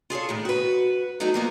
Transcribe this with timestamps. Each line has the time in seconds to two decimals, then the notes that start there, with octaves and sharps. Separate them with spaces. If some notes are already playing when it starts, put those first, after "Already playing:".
0.10 F4 G#4 A4 C#5
0.29 A2 D#3
0.45 F#4 B4
1.20 F#3 A3 D#4 A4
1.34 F3 A#3 B3